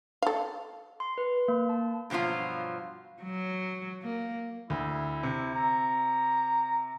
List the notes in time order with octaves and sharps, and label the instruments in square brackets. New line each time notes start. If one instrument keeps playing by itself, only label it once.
[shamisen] A4 F5
[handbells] C6
B4
A#3
A5
[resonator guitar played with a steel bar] G2 B2 F3 F#3 F4
[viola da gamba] F#3
A#3
[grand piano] D2 [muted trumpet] E4
[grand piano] C3
[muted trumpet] A#5